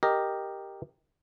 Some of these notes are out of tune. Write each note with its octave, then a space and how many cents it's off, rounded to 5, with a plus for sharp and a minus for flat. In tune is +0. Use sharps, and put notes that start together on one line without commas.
G4 +0 A#4 +0 D#5 +0